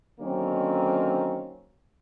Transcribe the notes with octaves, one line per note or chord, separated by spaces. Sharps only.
D3 D#3 F#3 A#3 C4 C#4